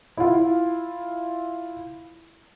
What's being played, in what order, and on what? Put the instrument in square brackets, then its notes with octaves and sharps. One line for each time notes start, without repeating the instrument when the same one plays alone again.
[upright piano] E4 F4